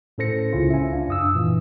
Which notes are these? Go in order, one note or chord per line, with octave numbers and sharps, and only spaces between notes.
A2 C#4 A4 C5 A#6 C#7
C#2 C#3 C#4 E4 F4
E5 G#5
D4 F5
F#2 D#6 E6
A#2 E3